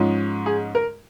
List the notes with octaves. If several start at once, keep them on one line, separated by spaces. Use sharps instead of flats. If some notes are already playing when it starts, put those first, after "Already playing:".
Already playing: G#2 F3 G#3 C#4
G#4
A#4